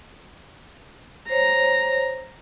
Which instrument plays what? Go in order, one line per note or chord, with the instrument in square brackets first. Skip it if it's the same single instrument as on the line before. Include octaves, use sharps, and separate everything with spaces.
[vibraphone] C5 C#5 [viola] A#5